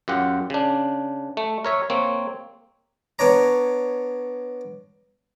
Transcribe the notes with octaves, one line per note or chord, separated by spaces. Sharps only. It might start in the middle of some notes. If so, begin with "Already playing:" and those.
F#2 F4 G4 F#5
C#3 D4
A3
A#4 C#5 E5
A#3 C4 C#5
B3 D4 C#5 A#5